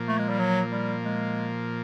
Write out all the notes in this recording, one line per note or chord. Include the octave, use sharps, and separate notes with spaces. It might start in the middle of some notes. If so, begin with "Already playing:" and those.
Already playing: A#2 F3 A#3
A3
G#3
G3
F#3
G3
G#3